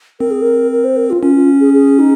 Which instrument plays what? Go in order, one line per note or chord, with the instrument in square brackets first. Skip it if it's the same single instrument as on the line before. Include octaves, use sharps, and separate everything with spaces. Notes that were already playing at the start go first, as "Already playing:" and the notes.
[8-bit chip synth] C4 [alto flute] A#4
[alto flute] G#4
A#4
A#4
C5
A#4
F4
[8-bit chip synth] C#4 [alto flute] F4
[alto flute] F4
G#4
G#4
D#4